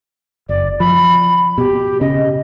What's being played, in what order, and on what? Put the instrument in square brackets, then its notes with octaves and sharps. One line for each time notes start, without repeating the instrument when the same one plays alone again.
[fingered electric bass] F#1 [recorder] D5
[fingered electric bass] F3 [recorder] B5
[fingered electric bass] B2 [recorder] G4
[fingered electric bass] C#3 [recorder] D#5